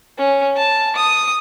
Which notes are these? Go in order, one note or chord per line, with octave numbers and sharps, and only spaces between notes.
C#4
A5
D#6